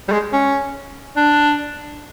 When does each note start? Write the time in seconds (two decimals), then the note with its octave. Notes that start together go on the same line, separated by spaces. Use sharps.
0.09 G3
0.12 G#3
0.33 C#4
1.17 D4